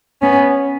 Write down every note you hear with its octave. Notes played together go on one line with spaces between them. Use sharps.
B3 C#4